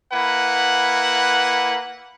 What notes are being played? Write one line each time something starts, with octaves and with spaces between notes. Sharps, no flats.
A#3 E4 B4 F#5